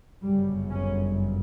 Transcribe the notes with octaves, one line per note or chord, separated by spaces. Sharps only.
G1 F#2 C#3 G3
C#4